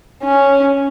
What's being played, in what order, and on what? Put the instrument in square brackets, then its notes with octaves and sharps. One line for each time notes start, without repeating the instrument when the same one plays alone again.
[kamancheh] C#4